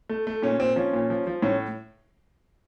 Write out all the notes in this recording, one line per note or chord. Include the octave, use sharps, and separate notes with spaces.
A3
A3
A#2 C#4
A#2 C4
F3 C#4
A#2
F3
F3
A2 C#4